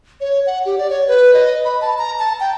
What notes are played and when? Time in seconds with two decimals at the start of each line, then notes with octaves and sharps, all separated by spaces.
0.21 C#5
0.46 F#5
0.65 G4
0.78 D5
0.90 C#5
1.08 B4
1.34 D#5
1.65 B5
1.81 A5
1.98 A#5
2.19 A5
2.40 G5